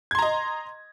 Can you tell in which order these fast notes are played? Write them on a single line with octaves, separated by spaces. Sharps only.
G#6 C6 A#5 D#5